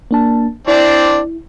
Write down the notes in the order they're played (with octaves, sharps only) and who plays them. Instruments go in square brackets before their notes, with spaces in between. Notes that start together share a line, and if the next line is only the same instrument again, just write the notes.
[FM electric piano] A#3 D4 A5
[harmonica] C4 D4 D5 [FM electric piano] E4